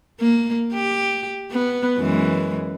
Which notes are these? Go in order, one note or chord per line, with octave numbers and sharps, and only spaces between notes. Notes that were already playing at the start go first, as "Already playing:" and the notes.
A#3
G4
B3
F#2 E3 G#3